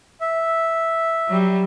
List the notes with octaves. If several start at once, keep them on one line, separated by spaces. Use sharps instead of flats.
E5
F#3 G3